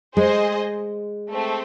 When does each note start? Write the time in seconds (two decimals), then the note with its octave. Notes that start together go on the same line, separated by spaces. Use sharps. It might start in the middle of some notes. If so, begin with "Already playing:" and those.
0.16 G#3 G#4 C5 D#5
1.31 A3 C4